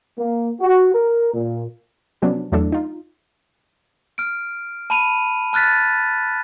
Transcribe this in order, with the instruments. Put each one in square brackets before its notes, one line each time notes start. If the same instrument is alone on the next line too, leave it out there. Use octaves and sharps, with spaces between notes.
[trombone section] A#3
F#4
A#4
A#2
[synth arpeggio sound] C3 F3 F#3 B3 C#4 D4
E2 F#3 A3 D4 A4
D#4 F4
[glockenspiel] F6 D7
A5 B5 D#7 F7
A5 F6 F#6 A6 B6